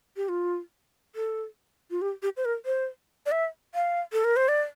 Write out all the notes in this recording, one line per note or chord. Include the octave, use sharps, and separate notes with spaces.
G4
F4
A4
F4
G4
G4
C5
A#4
C5
D5
E5
F5
A4
A#4
C5
D5